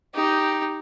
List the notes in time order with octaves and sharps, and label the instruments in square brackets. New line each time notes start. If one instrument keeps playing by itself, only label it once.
[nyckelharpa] D#4 G4